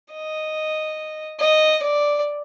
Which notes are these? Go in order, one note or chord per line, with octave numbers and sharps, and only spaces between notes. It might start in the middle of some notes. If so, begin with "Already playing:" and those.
D#5
D#5
D5